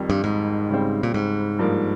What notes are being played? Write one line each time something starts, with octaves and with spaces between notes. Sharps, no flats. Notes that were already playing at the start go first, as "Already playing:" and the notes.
Already playing: F2 D#3 G3
G2
G#2
C#3 G3 C4
A#2
G#2
G2 F3 A#3